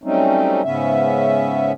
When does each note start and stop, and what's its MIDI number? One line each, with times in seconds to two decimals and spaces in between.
0.04 0.62 54
0.04 0.62 55
0.04 0.62 57
0.04 0.62 60
0.04 0.62 61
0.04 0.62 63
0.64 1.72 44
0.64 1.72 49
0.64 1.72 59
0.64 1.72 61
0.64 1.72 76